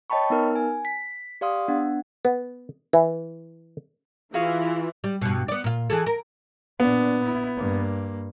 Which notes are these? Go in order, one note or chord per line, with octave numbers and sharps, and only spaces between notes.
C#5 D#5 G5 A5 B5 C#6
B3 D#4 A#4 F6
G#5
B6
G4 D5 F5 C6 D#6
B3 D4 F#5
B3
E3
E3 F4 F#4 G#4 F5
G3
G2 B2
B3 D5
A#2 F4
E3 G#4 A4
A#4
A#2 B3 D4
E4
G2 A#3